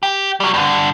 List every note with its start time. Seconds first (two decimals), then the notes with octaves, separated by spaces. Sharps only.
0.03 G4
0.40 F#3 G3
0.54 G2 D3